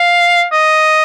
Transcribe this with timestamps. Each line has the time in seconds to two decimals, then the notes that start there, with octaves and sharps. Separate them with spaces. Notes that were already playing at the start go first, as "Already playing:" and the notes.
Already playing: F5
0.52 D#5